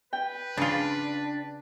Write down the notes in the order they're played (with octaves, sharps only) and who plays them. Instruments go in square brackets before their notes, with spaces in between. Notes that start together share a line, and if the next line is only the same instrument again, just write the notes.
[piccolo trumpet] B4 [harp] G5
[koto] C#3 F4 [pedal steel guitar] D4